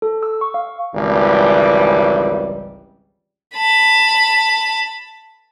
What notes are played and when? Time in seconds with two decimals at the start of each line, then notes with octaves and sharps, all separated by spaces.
0.02 A4
0.23 E6
0.41 C#6
0.54 F5
0.95 G#1 C#2 E3 G3
3.55 A5 B5